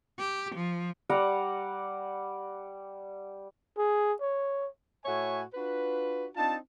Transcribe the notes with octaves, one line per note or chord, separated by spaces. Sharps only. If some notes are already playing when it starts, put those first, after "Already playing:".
G4
F3
G3 D5 F#5 A#5
G#4
C#5
A2 A3 F#4 C#5 E5 G#5
D4 F4 F#4 B4
C4 D4 D#4 F4 A5